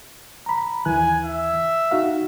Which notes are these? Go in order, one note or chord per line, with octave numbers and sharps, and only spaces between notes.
A#5 B5
D#2 E3 G#5 F#6
E5
D#4 F#4 F5